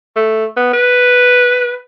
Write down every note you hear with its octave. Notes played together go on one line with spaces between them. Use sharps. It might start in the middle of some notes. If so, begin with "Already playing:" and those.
A3
B3
B4